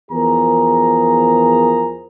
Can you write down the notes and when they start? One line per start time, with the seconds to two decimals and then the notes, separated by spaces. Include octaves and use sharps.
0.11 E2 F3 G#4 A#4 A#5